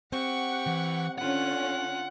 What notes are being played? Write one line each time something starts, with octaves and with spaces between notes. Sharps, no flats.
C4 G4 F#5 C#6
E3
D3 C#4 F4 F#5 F#6